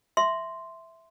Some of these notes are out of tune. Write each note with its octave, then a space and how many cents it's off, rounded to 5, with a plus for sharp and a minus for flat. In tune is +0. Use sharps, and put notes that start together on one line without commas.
E5 +0 C6 -5